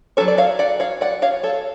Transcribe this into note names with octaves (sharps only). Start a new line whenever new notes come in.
F#3 C#4 A4 C#5
D5
C#5 F5
D5 F#5
C#5 F5
D5 F#5
C#5 F5
A4 C#5